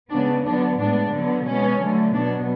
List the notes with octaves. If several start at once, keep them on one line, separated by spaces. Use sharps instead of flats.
C#3 G#3 B3 D4
D3 F#3 B3 D4
A2 G#3 B3 D4
D3 F#3 B3
B2 G#3 B3 C#4
D3 F#3 A3
B2 F#3 B3 D4